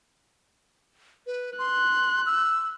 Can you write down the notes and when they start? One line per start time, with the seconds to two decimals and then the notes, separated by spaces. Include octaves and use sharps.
1.27 B4
1.59 C6 F#6
2.26 E6